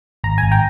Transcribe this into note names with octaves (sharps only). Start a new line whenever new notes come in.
G#1 A#5
G#1 G#5
G5 A#5